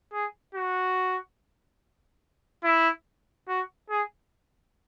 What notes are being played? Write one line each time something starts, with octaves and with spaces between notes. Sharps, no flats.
G#4
F#4
E4
F#4
G#4